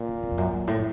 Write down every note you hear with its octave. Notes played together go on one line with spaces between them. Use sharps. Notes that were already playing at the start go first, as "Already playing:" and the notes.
Already playing: A#2
C#3
C3
F2
F#2
F#2
A2